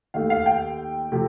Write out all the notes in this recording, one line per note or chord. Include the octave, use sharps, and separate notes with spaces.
D#2 D#3 A3 F5
F5
G5
C3 F3 A3